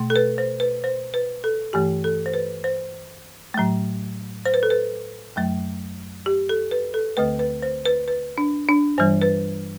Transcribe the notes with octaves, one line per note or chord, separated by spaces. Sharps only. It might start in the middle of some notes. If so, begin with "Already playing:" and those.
Already playing: B2 A3
A4
B4
C5
B4
C5
B4
A4
G2 E3 A3 G4
A4
C5
B4
C5
A2 F#3 A3
C5
B4
A4
B4
F#2 F#3 A3
G4
A4
B4
A4
D2 D3 A3 B4
B4
C5
B4
B4
D4
D4
G2 E3 G3 C5
B4